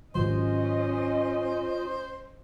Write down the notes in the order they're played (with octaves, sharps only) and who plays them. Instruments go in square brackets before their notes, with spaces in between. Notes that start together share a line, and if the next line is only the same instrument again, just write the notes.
[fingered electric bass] G#2 D#3 F#3 [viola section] C#4 D#5 [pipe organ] F4 [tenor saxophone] C5